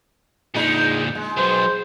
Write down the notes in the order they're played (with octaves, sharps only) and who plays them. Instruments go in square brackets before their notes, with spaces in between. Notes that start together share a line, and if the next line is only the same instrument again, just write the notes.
[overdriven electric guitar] A#2 D3 [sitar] G#3 D#4
[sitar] G#3
[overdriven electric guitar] F#3 B3 [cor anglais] C5